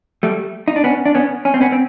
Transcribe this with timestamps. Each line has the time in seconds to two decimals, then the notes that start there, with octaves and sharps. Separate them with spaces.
0.23 G3 A3
0.68 D#4
0.76 D4
0.84 B3 C#4
1.05 D4
1.15 B3 C#4
1.45 C#4
1.54 C4
1.61 B3 C#4
1.72 C4